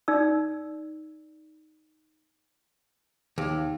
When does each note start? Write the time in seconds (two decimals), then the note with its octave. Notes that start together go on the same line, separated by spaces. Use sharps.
0.08 D#4 D5 E6
3.38 D#2